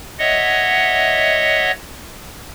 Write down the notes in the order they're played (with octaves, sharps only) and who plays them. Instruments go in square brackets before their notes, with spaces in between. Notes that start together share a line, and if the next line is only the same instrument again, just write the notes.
[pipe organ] C#5 D#5 E5 F#5